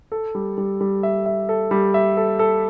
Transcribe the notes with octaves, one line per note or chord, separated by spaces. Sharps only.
A4
G3
G3
G3
E5
E5
A4
G3
E5
A4
A4